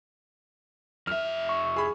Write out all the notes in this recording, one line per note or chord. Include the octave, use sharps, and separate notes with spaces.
F2 E5 F6
C#6
G#4 B5